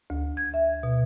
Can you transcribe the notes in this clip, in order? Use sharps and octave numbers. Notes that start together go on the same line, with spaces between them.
D2
G#6
E5
B2